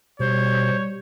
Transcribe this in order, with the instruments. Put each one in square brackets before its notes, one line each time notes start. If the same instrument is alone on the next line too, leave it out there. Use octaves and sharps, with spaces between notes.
[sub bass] B2 [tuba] G3 [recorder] C5 [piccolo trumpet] C#5